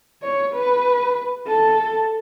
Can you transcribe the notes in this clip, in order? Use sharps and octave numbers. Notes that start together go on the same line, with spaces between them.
C#5
B4
A4